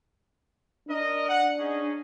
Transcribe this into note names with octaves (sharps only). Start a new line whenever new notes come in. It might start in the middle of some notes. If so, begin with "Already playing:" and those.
D4 A#4 D#5
F#5
C#4 D#4 G#4